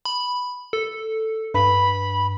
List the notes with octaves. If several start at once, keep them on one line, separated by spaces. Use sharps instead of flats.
B5
A4
G2 B5